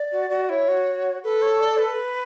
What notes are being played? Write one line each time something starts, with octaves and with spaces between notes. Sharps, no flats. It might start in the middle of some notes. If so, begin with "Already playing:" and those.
Already playing: D5
F#4
F#4
E4 C#5
F#4
A4 B4
C#5
D5
B4